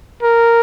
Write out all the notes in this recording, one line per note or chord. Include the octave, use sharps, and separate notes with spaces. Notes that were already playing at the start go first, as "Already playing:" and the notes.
A#4